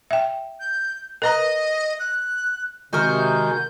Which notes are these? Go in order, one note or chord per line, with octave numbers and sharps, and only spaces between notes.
E5 G5
G6
A#4 B4 D#5 A#5
F#6
C3 D#3 G#3 F#4 A#4 G6